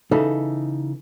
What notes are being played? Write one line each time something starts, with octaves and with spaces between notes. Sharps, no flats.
C#3 E3 D#4 A4